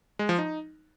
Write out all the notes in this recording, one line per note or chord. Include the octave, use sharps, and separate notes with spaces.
G#3
F3
D#4